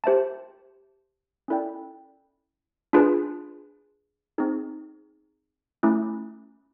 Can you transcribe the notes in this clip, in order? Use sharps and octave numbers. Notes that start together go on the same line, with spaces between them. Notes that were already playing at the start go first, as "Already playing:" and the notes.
G4 C5 E5 A5
C#4 E4 A4 D5 G5
D4 F4 G#4 B4
C4 D#4 G#4
A3 C#4 E4